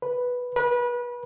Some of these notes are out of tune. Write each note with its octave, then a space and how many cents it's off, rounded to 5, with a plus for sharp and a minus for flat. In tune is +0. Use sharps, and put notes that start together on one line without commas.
B4 -5
B4 -30